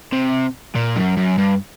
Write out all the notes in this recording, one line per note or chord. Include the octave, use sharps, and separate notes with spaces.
C3
A#2
F#2
F#2
G2